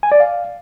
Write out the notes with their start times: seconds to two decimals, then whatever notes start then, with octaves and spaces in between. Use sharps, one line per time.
0.03 G#5
0.12 D5
0.20 F5